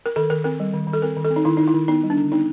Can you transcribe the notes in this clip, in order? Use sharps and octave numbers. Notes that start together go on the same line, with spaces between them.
A#4
D#3 A4
D#3 A#4
C4 A#4
G3
D#3
D#3
A4
C4 A#4
D#3
A4
C4
D#4
D#3 E4
D#3 D#4
E4
D#3
B3 D#4
G3
D4
D3
B3 D#4